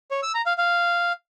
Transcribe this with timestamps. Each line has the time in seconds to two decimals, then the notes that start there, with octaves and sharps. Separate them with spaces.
0.11 C#5
0.23 E6
0.34 A#5
0.46 F5
0.58 F5